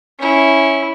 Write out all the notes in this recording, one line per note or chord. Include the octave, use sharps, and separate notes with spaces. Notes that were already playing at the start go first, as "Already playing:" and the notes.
C#4 E4